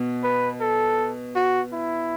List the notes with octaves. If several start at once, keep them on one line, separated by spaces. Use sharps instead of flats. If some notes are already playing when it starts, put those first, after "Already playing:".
Already playing: B2
B4
A4
F#4
E4